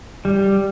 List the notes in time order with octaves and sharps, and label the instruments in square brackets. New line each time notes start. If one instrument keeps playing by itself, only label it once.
[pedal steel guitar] G3